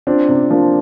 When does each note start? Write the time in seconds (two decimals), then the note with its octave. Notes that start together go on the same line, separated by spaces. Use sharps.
0.07 C4 D4 F4
0.29 C3
0.50 F3 A#3 D4